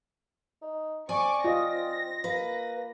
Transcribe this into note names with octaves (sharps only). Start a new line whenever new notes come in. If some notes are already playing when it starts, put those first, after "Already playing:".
D#4
C4 D5 G#5 C#6 D6
F4 D#5 A#6
A#3 B4